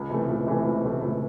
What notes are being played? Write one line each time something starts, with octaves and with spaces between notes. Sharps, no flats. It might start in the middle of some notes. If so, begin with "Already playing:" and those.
Already playing: C#2
C3 E3 A3
C#2
C3 E3 A3
C#2
C3 E3 A3
C#2